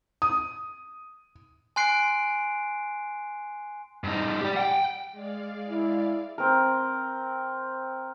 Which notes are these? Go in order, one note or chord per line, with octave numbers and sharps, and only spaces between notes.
D#6
G#5 C6 F#6 C7 D7
G2 D#4
G4 D5
F#5 G5
G#3 D5 F5
E4
C4 A#4